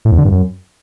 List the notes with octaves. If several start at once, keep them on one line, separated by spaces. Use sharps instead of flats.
A2
E2
D3
G2
F#2